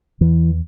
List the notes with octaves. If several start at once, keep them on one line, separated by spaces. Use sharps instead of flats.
E2 E3